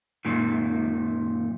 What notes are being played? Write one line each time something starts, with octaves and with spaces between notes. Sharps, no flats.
F#2 A#2 D#3